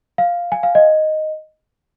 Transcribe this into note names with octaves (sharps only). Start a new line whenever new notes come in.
F5
G#5
F5
D#5